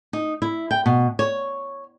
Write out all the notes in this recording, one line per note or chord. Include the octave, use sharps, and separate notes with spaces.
D#4
E4
G5
B2
C#5